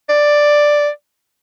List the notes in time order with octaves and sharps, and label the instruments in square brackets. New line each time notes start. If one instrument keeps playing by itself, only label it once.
[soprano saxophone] D5